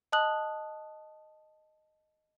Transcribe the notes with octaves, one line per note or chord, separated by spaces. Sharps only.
D#5 A5 D#6 F#6 F#7